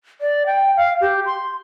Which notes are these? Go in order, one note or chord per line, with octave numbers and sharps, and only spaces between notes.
D5
G5
F5
G4
C6